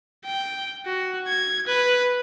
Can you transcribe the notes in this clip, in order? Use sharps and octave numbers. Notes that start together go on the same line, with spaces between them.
G5
F#4
G#6
B4